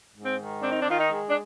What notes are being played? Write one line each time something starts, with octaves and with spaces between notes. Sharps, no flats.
G#2
C4
D#3
C4 D4
D#4
D4
D#3 F4
D#4
G#3
D4